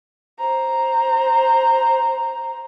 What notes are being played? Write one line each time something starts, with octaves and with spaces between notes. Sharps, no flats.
C5 A#5